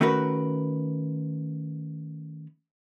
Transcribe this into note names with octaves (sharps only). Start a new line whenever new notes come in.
D#3 A3 C#4 F#4 A#4 B4